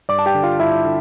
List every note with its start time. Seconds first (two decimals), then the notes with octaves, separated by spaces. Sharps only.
0.09 G2 D5 D6
0.19 A5
0.26 G4 G5
0.35 D3
0.43 F4 F5
0.60 G2 E4 E5
0.85 D3